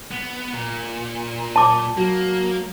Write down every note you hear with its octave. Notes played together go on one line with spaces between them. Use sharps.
B3
A#2
A5 D6
F#3 A#3